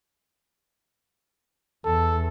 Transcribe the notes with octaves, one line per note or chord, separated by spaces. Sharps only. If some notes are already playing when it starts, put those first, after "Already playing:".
E2 A4